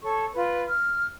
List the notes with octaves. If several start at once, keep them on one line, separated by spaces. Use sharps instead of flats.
A4 C#5 C#6
F4 B4
F6